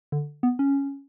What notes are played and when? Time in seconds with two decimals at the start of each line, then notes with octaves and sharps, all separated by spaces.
0.12 D3
0.43 B3
0.59 C#4